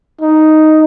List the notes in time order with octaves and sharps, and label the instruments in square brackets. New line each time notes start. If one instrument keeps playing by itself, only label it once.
[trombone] D#4